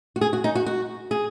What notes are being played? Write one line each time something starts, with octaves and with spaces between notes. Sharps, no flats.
F#4
G#4
F#4
D#4
F#4
F#4
G#4